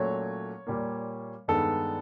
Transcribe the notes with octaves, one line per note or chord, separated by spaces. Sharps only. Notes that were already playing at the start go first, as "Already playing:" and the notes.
Already playing: A#2 F#3 A3 C#4 C#5
A#2 G3 A#3
G2 D#3 G#3 B3 A4